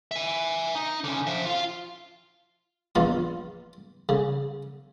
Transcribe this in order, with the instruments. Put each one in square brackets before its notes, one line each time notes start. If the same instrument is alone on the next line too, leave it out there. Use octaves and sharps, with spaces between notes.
[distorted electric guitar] E5 G#5
D#4
D3 C#4
F3 E5
F4 F5
[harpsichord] A#1 E2 F4 C6
C#3